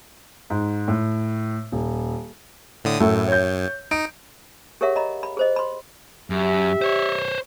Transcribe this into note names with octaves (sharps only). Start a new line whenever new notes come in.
G#2
A2
D#1
A2 D3 D#6
F#2 A2 A4
C#5 G6
D#4 D7
G4 G#4 A#4 C#5 E5 F#5
D#5 A#5 B5
B5
G#4 C5 D#5
B5 C6
F#2 G4 E5
C5 C#5